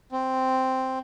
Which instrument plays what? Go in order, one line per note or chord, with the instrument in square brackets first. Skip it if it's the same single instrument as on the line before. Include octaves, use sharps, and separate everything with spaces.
[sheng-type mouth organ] C4